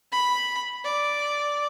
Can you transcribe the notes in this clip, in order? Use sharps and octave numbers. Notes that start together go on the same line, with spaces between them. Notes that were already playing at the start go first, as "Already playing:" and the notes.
B5
D5